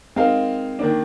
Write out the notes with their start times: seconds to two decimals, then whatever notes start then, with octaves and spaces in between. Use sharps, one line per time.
0.16 G#3 C4 D#4 A#4 F5
0.79 D#3 A#3 D4